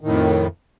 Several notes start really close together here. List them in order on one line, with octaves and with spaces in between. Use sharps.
D#3 A2 F2